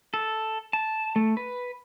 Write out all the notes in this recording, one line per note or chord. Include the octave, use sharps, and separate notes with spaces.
A4
A5
A3
B4